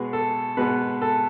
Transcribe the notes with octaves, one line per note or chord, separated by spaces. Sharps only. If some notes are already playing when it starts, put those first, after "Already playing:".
Already playing: B2 G#3 B3 G#4
A4
B2 G#3 B3 B4
A4